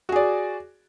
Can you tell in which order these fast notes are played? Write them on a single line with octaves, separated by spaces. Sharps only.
F#4 G#4 D5